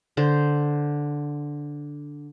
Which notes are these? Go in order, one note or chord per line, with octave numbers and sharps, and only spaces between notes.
D3 C5